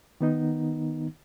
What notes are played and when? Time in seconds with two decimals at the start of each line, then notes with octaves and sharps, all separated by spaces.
0.21 D#3 B3 D#4